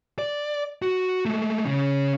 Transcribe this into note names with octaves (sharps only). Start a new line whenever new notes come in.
D5
F#4
G#3 A3
C#3 C#4